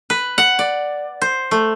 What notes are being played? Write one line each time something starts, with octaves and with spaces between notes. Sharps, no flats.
B4
F#5
D5
C5
A3